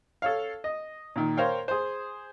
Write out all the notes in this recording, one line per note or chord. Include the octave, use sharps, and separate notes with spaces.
A4 C#5 F5
D#5
A#2 D#3
A#4 C5 C#5 F5 G5
G#4 C5